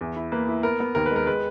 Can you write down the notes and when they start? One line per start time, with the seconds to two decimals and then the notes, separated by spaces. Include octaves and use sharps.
0.01 E2
0.16 E4
0.32 A#3 B4
0.49 E4
0.63 B3 A#4
0.80 B3
0.95 D#2 A#4
1.06 B4
1.11 G#3 A#4
1.26 G#3 B4